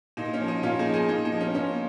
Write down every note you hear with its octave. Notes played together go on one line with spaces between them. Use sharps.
A#2 D#4
C#4
F3
D#4
A#2 C#4 F4
D#4 G#4
F3
D#4 G#4
A#2 D#4
D#4
F3
C#4
A#2 C#4